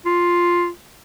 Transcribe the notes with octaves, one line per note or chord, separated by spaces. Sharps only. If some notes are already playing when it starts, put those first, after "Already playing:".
F4